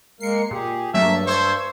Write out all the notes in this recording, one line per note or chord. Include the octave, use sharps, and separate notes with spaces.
G#3 A#3 A#4 C7 C#7
A#2 G4 G#4
G2 F#3 A3 A#3 E5 A5
C5 C#6 E6 G#6